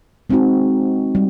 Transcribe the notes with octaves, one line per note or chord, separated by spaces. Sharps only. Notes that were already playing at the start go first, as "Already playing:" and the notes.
G#3 C4 D#4 F#4
G3